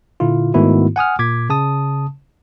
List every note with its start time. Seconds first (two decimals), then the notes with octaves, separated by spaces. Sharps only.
0.20 A#2 D3 E4 F4
0.54 G#2 D#3 A3 B3 E4 F#4
0.96 F#5 G#5 D#6 F6
1.19 A#2 D6 G#6 B6
1.50 C#3 A5 D#6